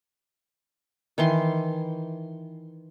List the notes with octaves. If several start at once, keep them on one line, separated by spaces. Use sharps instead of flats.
D#3 E3 C6